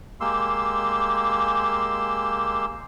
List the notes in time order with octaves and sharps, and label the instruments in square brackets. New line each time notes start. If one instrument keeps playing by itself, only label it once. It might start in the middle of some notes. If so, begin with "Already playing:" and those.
[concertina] G#3 A#3 G4 C6 E6